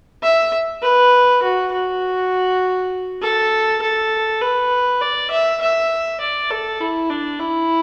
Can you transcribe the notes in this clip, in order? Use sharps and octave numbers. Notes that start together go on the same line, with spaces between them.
E5
B4
F#4
F#4
A4
A4
B4
D5
E5
E5
D5
A4
E4
D4
E4